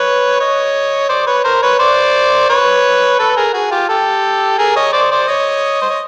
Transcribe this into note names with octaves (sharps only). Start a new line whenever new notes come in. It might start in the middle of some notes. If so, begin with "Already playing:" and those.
Already playing: B4 C#5
C#5 D#5
C5 D5
B4 C#5
A#4 C5
B4 C#5
C5 D5
B4 C#5
A4 B4
G#4 A#4
F#4 G#4
F4 G4
G4 A4
G#4 A#4
C#5 D#5
C5 D5
C5 D5
C#5 D#5
C5
C#5